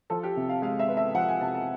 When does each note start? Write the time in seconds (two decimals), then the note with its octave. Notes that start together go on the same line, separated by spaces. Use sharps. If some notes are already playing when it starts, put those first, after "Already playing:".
0.10 F3 A4
0.23 G4
0.36 C3
0.49 F5
0.62 G#3 F5
0.79 E5
0.88 B3
0.97 E5
1.14 F3 F#5
1.28 G#5
1.41 C3 A5
1.55 A5